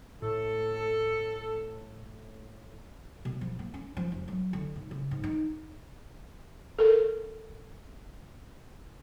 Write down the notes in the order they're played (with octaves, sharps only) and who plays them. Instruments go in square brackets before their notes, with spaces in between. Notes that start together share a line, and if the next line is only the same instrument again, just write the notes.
[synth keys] A2 [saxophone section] A4
[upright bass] B2
F3
A#3
C#4
F3
F1
F#3
D3
G#2
C#3
G#2
D#4
[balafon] A4 A#4